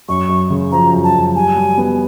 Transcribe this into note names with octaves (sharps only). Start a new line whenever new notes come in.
F#2 C#6
F#2
C#3
F3 A#5
F#2
A5
F#2
G3 G#5
G3
B3